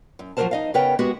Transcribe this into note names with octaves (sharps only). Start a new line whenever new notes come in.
F#2
F3 F#3 G#3 A#4 C5 A5
D#4 D#5 F5
C#3 B3 A#4 B4 C#5 G5
G#3 B3 F#4 G4